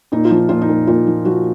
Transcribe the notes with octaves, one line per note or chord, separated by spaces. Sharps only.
A#2 D#4
F4
F3
D#4
A#2 F4
D#4
A#2
A#2 F4
F3
F3 F#4